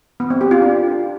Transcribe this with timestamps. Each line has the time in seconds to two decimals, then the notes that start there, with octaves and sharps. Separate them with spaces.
0.20 B3
0.30 C4
0.41 G4
0.51 F4
0.62 D4